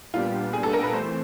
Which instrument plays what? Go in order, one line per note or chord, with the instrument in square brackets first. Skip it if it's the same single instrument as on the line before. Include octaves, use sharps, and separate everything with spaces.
[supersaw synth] A#2 G3 B3 D4 G4 [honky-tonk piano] F4
[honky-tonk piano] G#4
A4
A#4
B4
[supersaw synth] E3 A3 C4 [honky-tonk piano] C5